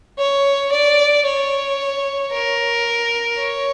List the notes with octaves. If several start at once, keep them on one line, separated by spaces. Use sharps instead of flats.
C#5
D5
C#5
A#4
C#5